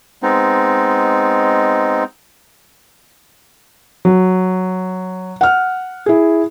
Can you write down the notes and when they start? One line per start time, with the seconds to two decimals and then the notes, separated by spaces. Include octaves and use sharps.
0.23 G#3 B3 C4 D#4
4.05 F#3
5.41 F#5 F6
6.06 E4 G#4